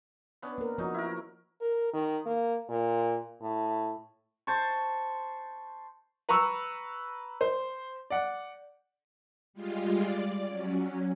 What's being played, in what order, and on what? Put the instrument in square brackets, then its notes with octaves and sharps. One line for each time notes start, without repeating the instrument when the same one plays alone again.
[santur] B3 C#4 D4
[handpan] A#3 A#4
[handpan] F3 F#4 [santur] C#4 D#4
[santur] E4 A#4
[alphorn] A#4
D#3
A#3
A#2
A2
[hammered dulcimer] C5 A5 C#6
[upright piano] B4 A#5 B5 C#6 E6
C5
D5 F#5
[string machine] G3 G#3 F4
D5
F#3 C#4